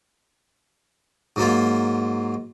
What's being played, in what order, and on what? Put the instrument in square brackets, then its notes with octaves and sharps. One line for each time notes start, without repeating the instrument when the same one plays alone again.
[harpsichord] G#2 F#3 A#3 F4